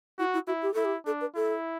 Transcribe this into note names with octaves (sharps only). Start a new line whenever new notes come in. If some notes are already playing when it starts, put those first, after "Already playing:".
E4 F#4
E4
E4 F#4
G4
E4 A4
G4
D4 A4
B4
E4 A4